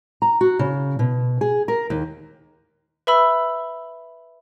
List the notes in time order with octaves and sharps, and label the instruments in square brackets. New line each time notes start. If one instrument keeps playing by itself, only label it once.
[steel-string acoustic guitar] A#5
F#4
C#3
B2
G#4
A#4
D#2
[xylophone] B4 E5 B5 E6